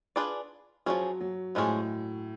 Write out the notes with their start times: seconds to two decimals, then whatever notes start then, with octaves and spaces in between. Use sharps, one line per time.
0.16 D4 F4 G#4 B4 D5
0.86 F3 F#3 G#3 C#4 G#4
1.20 F#3
1.55 A2 F3 G#3 C#4 G#4